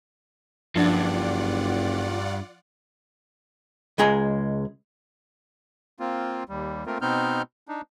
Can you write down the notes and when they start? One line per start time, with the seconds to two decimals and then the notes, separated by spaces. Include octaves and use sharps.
0.75 F#1 G2 F3 D4 F4 D5 F#5
3.98 C#2 G#3 G#4 A#5
6.00 A#3 C4 F4
6.49 D#2 G3
6.86 A3 A#3 C4 F4 A#4
7.01 B2 B3 C4 D#4 F6 G6
7.68 D4 D#4